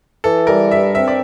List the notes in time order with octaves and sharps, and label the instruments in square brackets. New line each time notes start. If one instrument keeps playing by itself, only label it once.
[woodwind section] E3 [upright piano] A4
[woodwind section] G3 [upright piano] A#4
[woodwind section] G2 [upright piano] E5
[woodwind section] C4 [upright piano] E5
[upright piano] D5